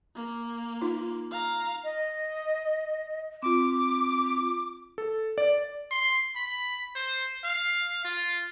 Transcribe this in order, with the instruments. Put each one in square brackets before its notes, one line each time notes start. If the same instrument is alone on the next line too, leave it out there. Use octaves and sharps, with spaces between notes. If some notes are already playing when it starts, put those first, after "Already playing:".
[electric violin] A#3
[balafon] D#4 F4
[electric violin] F5 A#5
[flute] D#5
[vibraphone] C4 F4 [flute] D6
[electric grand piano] A4
D5
[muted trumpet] C6
B5
C5
F5
F4